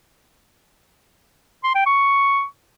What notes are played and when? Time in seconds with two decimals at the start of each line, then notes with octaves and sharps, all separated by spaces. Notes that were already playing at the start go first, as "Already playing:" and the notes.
1.64 C6
1.75 G5
1.86 C#6